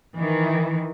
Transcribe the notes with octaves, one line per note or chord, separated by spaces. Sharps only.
D#3 E3